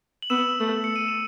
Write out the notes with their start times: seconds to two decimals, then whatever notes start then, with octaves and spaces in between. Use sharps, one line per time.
0.22 F#7
0.30 B3 E6 E7
0.60 A3
0.84 C#7
0.96 D#7
1.08 E7